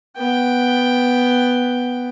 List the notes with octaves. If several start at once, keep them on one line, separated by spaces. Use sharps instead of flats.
B3 G5